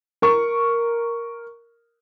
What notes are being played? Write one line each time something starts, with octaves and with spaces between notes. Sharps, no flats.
A#4 C#6